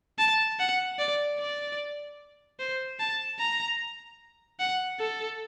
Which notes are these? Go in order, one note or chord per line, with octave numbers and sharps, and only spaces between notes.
A5
F#5
D5
D5
C5
A5
A#5
F#5
A4